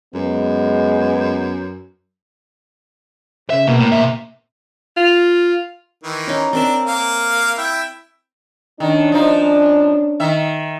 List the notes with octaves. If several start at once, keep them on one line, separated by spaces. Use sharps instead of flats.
F#2 G#3 B3
C#3 E5
B2 A#3
A2
B2 E5
F4
D#3 E3
C#4 D#4
C4 D4 A#4 E5
A#3 F5
E4 E5 G5
D#3 C#4 D4
F3 D#4
D#3 E5